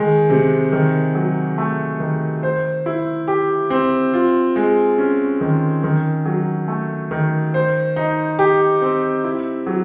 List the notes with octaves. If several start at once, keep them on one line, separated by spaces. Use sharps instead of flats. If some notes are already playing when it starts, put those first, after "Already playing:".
Already playing: D#3 G#3
C3
D#3
F#3
A3
D#3
C5
E4
G4
C4
F4
G#3
C#4
D#3
D#3
F#3
A3
D#3
C5
D#4
G4
C4
E4
F#3